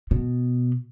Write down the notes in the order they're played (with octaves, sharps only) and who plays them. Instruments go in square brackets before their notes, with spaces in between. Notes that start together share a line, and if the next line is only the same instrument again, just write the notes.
[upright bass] B2